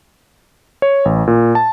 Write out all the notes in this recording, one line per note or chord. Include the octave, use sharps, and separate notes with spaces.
C#5
A1
A#2
A5